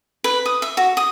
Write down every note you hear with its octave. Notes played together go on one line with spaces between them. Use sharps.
B4
D#6
E5
F#4
D#6